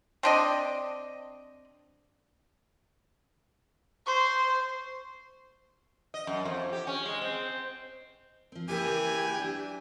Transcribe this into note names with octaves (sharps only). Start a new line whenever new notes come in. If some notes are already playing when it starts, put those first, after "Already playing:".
C4 D4 D#5
C5 C6 C#6
D#5
F#2
F2
G4
C#4
G#3
C4
F3 C4
C#3 E3 A#3 G4 G#5
F#3 D4